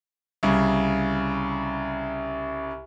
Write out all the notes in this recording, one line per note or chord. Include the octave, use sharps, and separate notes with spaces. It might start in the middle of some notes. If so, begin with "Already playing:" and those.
C2 C#3